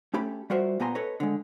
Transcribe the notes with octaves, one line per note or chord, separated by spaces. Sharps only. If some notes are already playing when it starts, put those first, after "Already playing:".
A3 C#4 G4 A4 B5
G3 F4 F#4 A#4 C5 E5
A#2 B3 G4 G#5 A#5 C6
A4 B4 C#5 D#5
D3 G#3